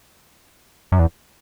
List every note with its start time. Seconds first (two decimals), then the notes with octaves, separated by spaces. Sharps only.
0.92 F#2
0.99 E2